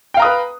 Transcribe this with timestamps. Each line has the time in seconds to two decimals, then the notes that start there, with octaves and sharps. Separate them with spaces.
0.14 G5
0.17 F5
0.19 A#5
0.22 D#6
0.25 B4